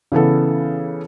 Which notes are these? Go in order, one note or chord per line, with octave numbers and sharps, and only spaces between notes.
C#3 E3 B3 A4